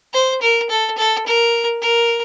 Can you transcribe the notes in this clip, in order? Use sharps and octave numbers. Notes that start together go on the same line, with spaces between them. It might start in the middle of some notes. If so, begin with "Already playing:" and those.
C5
A#4
A4
A4
A#4
A#4